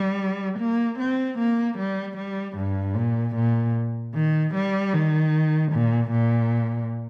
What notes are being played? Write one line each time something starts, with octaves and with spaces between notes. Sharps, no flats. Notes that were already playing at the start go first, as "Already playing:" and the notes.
Already playing: G3
A#3
C4
A#3
G3
G3
G2
A#2
A#2
D#3
G3
D#3
A#2
A#2